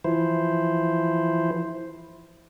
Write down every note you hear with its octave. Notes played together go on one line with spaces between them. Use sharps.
E3 F3 E4 C5